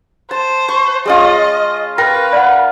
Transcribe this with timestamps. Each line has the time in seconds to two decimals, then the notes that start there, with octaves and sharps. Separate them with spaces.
0.31 C5 A5
0.69 C#6
1.06 G#3 C#4 F4 D#5
1.98 A#4 B4 G5 A#6
2.33 D5 F#5